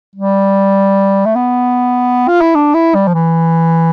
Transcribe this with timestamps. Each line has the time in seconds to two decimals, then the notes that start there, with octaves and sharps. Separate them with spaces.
0.15 G3
1.25 A3
1.35 B3
2.28 F4
2.41 E4
2.55 D4
2.74 E4
2.94 G3
3.07 F3
3.14 E3